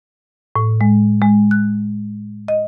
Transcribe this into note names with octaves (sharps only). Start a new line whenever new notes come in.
A2
G#3
G#3
F#6
D#5